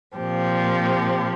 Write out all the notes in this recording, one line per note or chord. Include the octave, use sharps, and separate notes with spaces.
A#2 F3 C4 G4